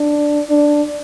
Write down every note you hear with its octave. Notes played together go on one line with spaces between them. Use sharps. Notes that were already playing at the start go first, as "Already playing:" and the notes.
Already playing: D4
D4